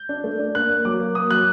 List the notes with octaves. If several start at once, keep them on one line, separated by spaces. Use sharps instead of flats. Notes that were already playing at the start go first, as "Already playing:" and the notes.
Already playing: G6
D4
A3
D4
A#3 F#6
A#3
F#3 D6
A#3
A#3 D#6
F#3 F#6